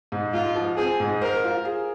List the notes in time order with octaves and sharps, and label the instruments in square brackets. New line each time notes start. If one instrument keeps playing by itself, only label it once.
[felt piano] G#2
[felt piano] G#2 [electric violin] F4
[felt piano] F3
[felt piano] C4 [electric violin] G#4
[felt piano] G#2
[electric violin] A#4 [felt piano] C5
[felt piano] F4
G#4